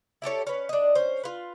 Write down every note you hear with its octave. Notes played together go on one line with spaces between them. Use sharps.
E4 G4 A4 C#5
C#4 B4
D4 D#5
C#4 C5
F4 B4